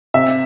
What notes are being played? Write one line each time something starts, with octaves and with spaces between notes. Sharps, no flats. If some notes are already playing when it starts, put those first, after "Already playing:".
C3 E5